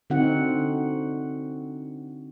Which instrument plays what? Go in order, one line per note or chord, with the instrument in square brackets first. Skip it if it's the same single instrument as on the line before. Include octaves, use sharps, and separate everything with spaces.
[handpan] D3 C4 D#4 F#4 F#5